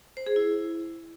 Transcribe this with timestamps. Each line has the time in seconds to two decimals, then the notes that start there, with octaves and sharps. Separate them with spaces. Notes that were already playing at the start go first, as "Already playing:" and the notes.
0.17 C5
0.26 G#4
0.36 E4